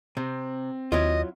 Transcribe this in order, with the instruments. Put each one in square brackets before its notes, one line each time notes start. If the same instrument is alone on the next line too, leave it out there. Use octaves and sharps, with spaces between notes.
[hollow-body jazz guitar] C3 [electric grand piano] C4
[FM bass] D#2 [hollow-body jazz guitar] F#3 E4 F4 [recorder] D#5